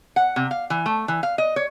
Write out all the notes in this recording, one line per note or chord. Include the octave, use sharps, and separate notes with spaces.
F#5
C3
F5
E3
A3
E3
F5
D#5
C#5